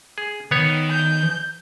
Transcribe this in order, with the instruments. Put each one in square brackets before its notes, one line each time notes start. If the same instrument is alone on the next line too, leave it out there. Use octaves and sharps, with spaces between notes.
[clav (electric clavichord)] G#4
[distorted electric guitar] D#3 [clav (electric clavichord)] B3 C#5
[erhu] G6